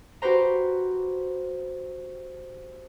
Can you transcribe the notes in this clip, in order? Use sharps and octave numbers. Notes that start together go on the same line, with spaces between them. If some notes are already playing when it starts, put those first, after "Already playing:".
F#4 G4 B4 C5 A#5